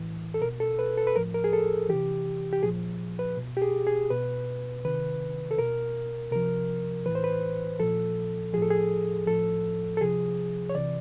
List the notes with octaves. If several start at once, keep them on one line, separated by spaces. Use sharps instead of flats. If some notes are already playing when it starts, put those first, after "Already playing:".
Already playing: A2 E3
A4
B2 A#4
A4
B4
A4
B4
A2 F3 A#4
A#4
G#4
A4
C3 E3 G4
G4
A#2 F3 G#4
B4
B2
G4
G#4
G#4
B2 B4
C3 D#3 B4
A4
B2 A#4
C3 F3 A#4
A2 E3 B4
C5
B4
A#2 F3 A4
A2 F3 G#4 A4
G#4
A2 F3 A4
A4
C3 F3 G#4
C#5
C3 E3 D5